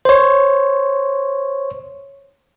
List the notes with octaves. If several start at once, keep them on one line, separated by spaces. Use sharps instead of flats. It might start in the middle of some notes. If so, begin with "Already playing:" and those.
C5 C#5